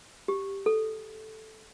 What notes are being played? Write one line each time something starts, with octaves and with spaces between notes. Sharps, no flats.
G4
A4